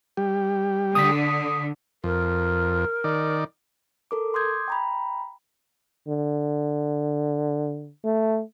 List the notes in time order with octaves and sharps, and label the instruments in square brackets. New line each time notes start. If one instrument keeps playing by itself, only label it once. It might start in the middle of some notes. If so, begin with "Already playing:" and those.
[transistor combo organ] G3 G4
[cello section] D3 [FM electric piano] D#6 B6
[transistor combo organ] F2 [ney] A#4
[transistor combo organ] D#3 D5
[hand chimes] A4 A#4 D6
C6 D6 D#6 G6 G#6
G5 A#5 B5
[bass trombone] D3
A3